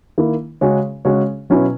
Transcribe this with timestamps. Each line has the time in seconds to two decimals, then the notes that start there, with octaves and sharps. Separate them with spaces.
0.18 D#3 A#3 E4
0.61 C#3 G#3 C#4 F#4 C#5
1.05 C#3 G#3 C#4 F#4 C#5
1.50 B2 F#3 C#4 E4 B4